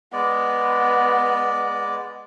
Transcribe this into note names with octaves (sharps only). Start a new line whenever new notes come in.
G#3 B3 D5